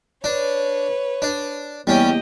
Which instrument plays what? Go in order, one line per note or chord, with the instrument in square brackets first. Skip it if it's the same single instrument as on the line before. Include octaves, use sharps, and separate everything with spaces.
[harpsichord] D4 [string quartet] B4 C#5
[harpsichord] D4
[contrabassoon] E2 [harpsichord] G3 C#4 [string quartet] A#3 G4 D#5